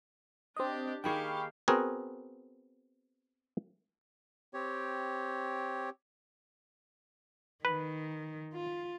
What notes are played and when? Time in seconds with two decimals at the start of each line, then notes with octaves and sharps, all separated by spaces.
0.56 C4 D4 G4 D#5
1.04 D#3 A#3 G4 G#4 F5 G5 B5 C#6
1.68 B3 C4 F#4 G#4 A#4
4.54 C4 G4 C#5
7.65 D#3 B4
8.54 F4